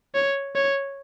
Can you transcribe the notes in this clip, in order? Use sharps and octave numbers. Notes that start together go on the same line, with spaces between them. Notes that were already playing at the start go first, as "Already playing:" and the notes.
C#5
C#5